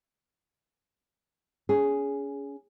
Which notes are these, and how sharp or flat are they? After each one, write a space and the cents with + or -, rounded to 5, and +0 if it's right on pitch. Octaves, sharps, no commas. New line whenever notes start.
C#4 +30 G#4 +0